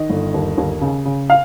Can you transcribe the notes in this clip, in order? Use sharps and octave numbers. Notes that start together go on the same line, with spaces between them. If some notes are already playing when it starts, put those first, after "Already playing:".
Already playing: D#3 D#5
G1
D#2
D#2
C#3
C#3
F5